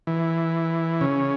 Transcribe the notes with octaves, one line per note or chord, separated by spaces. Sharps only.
E3
C#3